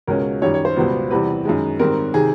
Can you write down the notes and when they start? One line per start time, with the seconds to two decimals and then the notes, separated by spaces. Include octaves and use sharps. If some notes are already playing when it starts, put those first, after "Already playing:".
0.07 C#2 B2 G#3 C#4 A#4
0.42 F#2 D#3 G3 C#5
0.54 C#5
0.65 C5
0.76 C#2 B2 G3 B3
1.11 E2 C3 E3 G3 B4
1.45 F#2 D#3 G#3
1.79 G#2 D#3 G3 C4 A#4
2.14 C3 D#3 G#4